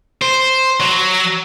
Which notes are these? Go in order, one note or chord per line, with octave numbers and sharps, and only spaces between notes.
C5
F#3